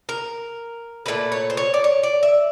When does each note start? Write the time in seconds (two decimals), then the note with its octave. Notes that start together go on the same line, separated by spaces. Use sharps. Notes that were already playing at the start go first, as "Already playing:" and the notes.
0.09 A#4
1.06 A#2 F#3 A3 B4
1.32 C#5
1.50 C5
1.57 C#5
1.74 D5
1.84 C#5
2.03 D5
2.23 E5